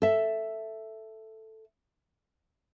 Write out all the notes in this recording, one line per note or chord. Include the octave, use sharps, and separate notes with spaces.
A4 E5